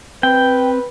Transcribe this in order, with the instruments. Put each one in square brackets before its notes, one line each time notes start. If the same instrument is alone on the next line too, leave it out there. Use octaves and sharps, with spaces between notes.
[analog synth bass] C4 [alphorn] B4 [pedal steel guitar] G5